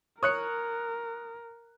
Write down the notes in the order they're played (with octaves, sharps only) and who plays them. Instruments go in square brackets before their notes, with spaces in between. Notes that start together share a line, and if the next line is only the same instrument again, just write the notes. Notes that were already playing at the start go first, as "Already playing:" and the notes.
[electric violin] A#4 [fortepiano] C#5 [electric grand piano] D#6 F#6 C#7